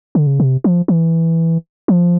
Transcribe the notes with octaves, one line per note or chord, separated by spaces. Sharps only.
D3
C#3
C3
F3
E3
F3